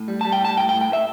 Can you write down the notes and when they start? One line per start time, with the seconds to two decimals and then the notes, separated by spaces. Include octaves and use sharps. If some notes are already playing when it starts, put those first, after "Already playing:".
Already playing: A2
0.08 G3
0.21 G3 A5
0.32 G5
0.40 A2 A5
0.57 A2 G5
0.69 G5
0.74 A2
0.81 G5
0.89 A2 E5